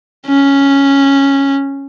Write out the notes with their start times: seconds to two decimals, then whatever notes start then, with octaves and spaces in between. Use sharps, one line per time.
0.27 C#4